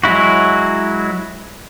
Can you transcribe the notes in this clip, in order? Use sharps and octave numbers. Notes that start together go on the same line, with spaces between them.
F#3 G#3 E4 F#4